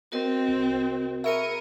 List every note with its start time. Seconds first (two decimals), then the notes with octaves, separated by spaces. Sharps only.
0.12 C4 F#4 A#4 D#5
0.48 C2
1.24 G#4 A#4 E5 B5 C#6 C#7 D#7